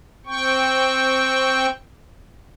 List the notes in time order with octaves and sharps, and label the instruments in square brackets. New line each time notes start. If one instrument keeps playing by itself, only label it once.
[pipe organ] C4 G5 C#6